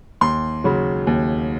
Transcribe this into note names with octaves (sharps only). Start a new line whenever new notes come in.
D#2 C6
C#3 F#3
D#2